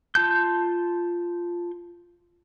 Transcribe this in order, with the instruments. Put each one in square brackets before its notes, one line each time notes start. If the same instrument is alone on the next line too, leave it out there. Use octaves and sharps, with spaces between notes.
[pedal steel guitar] F4 A5 G6